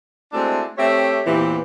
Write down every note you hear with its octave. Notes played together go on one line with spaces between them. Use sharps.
G#3 A3 C4 D4 E4 F#4
A3 C4 G4 C#5 E5
E2 A#2 E3 C4 G4